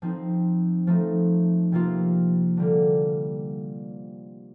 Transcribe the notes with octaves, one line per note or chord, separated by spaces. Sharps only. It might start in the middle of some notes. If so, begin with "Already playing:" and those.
F3 C4 D#4
F3 A3 D#4
C3 F3 A#3 F4
D3 G3 A#3